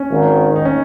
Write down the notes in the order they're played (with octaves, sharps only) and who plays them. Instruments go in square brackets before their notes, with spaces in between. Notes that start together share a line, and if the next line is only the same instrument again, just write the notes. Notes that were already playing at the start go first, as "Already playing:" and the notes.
Already playing: [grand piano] C#4
[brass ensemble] G#1 G#2 D#3
[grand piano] D#4
C#4